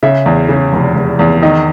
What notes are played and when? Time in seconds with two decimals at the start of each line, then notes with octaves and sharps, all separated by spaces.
0.03 C#3 E5
0.26 E2
0.49 C#3
0.73 F1
0.95 F1
1.19 E2
1.42 D#3 D#5